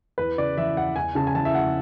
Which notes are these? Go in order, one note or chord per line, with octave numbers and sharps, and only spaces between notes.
E2 B4
C#3 D5
E3 E5
E2 F#5
E2 G#5
C#3 A5
G#5
E3 A5
E5
E2 F#5